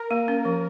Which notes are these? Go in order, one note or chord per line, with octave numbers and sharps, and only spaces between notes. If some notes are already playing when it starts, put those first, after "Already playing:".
Already playing: A#4
A#3
C#4
F3